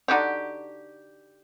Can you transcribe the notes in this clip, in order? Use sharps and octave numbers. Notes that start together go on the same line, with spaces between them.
D3 D#4 F#4 G4